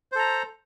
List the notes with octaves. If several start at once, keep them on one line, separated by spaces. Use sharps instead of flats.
A4 C5 A#5